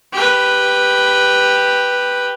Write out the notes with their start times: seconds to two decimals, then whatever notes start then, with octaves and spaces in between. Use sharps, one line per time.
0.13 G4 B4